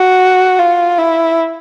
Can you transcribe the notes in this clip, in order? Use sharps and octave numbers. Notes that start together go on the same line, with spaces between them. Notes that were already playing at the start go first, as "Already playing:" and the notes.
Already playing: F#4
F4
E4